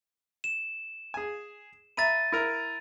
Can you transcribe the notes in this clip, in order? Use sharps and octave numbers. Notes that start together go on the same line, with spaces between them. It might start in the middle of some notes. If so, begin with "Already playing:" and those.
E7
G#4 G#5
E5 A#5 B5 A6 D#7
E4 A#4